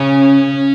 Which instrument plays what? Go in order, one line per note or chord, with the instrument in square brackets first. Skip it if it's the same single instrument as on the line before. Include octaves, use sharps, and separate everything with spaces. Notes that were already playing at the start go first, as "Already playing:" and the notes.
Already playing: [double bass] C#3 [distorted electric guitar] C#4